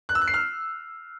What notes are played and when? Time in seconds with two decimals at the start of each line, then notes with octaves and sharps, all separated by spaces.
0.09 F#6
0.15 E6
0.21 F#6
0.28 C7
0.34 F6